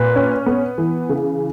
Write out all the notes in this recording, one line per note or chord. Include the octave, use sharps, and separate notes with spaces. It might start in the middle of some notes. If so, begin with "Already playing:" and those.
Already playing: A#2 B4
C#4
B3
E3
C#3